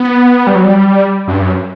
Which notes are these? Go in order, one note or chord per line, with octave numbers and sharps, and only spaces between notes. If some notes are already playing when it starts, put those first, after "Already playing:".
Already playing: B3
G3
F#3
G3
F#2
G2
F#2